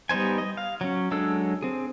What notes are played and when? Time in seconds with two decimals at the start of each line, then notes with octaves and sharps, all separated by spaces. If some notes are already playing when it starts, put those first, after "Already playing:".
0.09 G3 B3 D#4 C5 G#5
0.38 D#5
0.57 F5
0.81 F#3 C#4
1.11 F#3 G#3 D4 A4 E6
1.63 C4 G#4